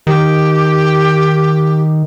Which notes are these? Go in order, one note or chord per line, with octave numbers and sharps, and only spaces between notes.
D#3 G4